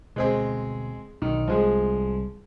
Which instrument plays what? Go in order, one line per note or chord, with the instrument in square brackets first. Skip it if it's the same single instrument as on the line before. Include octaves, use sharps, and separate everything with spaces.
[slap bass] D2 B2 [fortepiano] G#3 C4 G#4
[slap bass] B1 D3 [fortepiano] D#3
[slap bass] C2 [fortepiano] F3 G#3 G#4